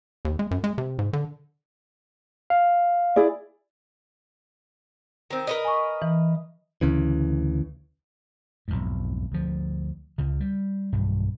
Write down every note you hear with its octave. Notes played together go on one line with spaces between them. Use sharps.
D#2
G#3
F#2
G#3
C3
G#2
D3
F5
E4 G#4 D5
D#3 C4
A#4 B4 D#5
G#5 C#6
E3
D2 C#3 E3
B1 F2 G#2
D2 F3
C#2 C#3
G3
B1 G2